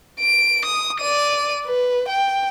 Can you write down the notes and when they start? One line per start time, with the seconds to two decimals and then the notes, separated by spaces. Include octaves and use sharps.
0.20 D7
0.65 D#6
1.00 D5 D#7
1.66 B4
2.08 G5